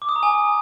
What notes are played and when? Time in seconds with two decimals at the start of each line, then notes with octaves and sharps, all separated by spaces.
0.02 D6
0.09 D#6
0.16 A#5
0.23 G#5